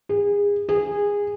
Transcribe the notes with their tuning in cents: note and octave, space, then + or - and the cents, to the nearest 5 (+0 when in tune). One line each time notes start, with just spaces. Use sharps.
G#4 -30
G#4 -20